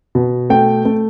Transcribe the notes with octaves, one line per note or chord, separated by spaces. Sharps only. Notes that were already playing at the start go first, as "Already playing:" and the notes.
B2
A3 G5
A3